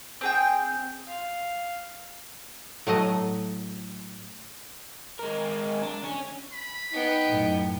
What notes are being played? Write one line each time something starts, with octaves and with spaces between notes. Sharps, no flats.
C4 G#4 G5
F5
A2 F#3 A3 D#5
G#3 A#4
D4
C#4
B5
B3 D#4 G5
F#2 A2